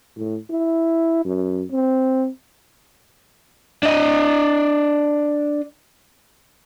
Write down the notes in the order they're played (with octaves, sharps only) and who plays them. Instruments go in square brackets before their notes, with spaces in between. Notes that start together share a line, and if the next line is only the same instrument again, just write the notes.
[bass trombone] A2
E4
F#2
C4
[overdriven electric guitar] D4 D#5